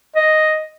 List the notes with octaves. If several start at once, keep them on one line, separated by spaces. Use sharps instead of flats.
D#5